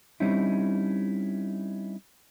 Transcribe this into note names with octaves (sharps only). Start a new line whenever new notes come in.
G3 C4 C#4 D#4 E4